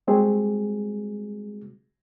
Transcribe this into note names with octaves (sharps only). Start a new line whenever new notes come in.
G3 G#3 C4 F#4 G#4